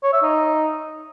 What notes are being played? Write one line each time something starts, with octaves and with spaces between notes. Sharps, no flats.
C#5
E5
D#4